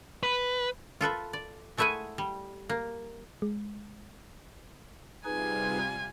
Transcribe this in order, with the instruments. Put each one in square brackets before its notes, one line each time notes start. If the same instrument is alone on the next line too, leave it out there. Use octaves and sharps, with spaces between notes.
[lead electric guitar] B4
[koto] F4 A4 B4 E5
D5
G#3 A3 E4 E5 F#5 G#5
G3
A#3
[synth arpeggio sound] G#3
[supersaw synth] C3 G3 F4 [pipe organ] D#4 G#4 B4 [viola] G#5